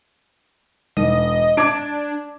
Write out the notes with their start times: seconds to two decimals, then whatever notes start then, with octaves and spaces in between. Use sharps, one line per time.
0.97 E1 D#5
1.57 D4 D6 G#6 D7